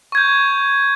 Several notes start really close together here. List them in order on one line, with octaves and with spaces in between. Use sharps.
C#6 G#6 G6